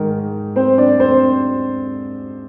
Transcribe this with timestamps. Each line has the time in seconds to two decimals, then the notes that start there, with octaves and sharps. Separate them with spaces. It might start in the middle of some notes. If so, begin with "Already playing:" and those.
Already playing: G#2 D#3 A#4
0.56 C4 C5
0.77 D4 D5
1.00 C4 C5